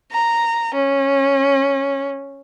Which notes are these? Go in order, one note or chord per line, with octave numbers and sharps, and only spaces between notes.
A#5
C#4